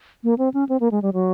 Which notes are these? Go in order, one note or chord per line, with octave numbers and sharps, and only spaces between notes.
A#3
C4
C#4
C4
A#3
G#3
G3
F#3